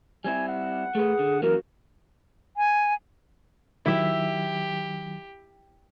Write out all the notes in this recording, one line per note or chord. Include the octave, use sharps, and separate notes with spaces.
G3 C4 E4 G#5
F#5
A3 G#4 B4
D3
F#2 E3 A#3 F#4 A#4
G#5
D#3 F#3 E4 G4 E5